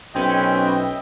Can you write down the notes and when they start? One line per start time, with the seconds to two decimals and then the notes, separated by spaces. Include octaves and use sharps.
0.15 B1 C4 C#4 B4 D#5 E5 G5